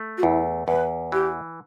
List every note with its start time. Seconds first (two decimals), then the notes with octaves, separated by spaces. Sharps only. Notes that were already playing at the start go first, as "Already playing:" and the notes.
Already playing: A3
0.17 F#4
0.23 E2 E4
0.68 E2 B4
1.12 E3 G4